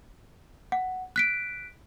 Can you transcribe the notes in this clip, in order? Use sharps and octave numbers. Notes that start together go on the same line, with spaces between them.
F#5
F#6 B6 D7